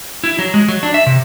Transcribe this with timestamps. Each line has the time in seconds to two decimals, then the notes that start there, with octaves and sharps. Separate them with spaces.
0.24 E4
0.39 F#3
0.54 G#3
0.68 F#3
0.83 D4
0.94 E5
1.06 C3